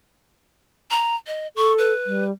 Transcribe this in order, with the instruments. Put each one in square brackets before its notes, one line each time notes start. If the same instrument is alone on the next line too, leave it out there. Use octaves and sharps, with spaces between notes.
[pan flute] A#5
D#5
[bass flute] A4 [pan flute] C#6
[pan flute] B4
[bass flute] G3